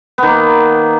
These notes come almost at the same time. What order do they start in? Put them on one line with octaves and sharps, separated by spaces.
B3 D#3 A#3